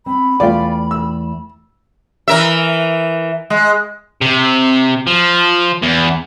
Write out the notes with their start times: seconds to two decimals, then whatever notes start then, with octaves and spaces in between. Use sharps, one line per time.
0.06 C4 B5
0.40 E2 A3 F4 D5 G5
0.91 E6
2.28 E3 A#4 E5
3.50 G#3
4.21 C3
5.07 F3
5.83 E2